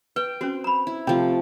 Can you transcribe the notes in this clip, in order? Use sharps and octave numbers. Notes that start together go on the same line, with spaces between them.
B4 G5
C4 C#4 F#4
A#5 B5
E4
C3 F3 A3 G5